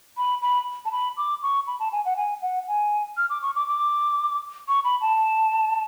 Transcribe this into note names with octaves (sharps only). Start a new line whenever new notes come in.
B5
B5
A5
B5
D6
C#6
B5
A5
G#5
F#5
G#5
F#5
G#5
F6
D6
C#6
D6
D6
C#6
B5
A5